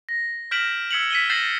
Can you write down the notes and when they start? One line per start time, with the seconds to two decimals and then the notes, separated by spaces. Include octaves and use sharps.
0.09 A#6
0.51 F6 G6 B6 D7 E7 F#7
0.68 A#6
0.91 E6 G#6 B6 C#7 F7 F#7
1.10 B6 D#7 G7
1.30 G6 A6 A#6 C7 E7 F#7